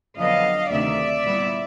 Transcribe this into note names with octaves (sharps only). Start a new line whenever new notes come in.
F2 D3 F#3 B3 D#5 F5
D2 C3 D#3 D5 E5
A#2 G3 B3 E4